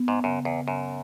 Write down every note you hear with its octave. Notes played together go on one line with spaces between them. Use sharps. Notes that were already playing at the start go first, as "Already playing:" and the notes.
Already playing: B3
G#2
F#2 C#3
E2
C#3
F#2